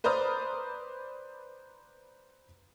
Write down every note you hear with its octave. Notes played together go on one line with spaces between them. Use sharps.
B4 C5 D5 A#5 D#6 F6